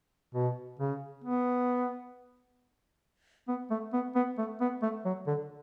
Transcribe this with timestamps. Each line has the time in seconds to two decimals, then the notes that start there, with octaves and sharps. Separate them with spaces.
0.35 B2
0.80 C#3
1.25 B3
3.48 B3
3.71 A3
3.93 B3
4.16 B3
4.38 A3
4.61 B3
4.82 A3
5.05 F#3
5.27 D3